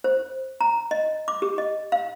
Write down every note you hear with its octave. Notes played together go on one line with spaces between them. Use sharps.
C5
A#5
D#5
D6
G4
D#5
F5